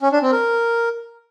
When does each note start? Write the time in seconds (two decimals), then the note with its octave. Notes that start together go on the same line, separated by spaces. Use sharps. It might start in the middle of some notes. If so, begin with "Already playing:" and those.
0.02 C#4
0.12 D4
0.22 C4
0.32 A#4